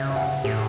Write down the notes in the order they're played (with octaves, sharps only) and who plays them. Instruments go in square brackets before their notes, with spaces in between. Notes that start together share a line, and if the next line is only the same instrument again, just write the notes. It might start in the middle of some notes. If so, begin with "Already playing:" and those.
Already playing: [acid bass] C#3 [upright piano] E5
[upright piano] E5
F#5
[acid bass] A2 [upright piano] G#4